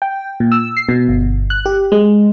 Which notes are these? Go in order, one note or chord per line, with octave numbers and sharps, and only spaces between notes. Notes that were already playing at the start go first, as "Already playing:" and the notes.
G5
A#2
E6
C7
B2
G1
F#6
G4
G#3